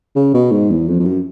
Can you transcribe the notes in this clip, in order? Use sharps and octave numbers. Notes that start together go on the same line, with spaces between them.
C#3
B2
G#2
E2
F2
F2
F#2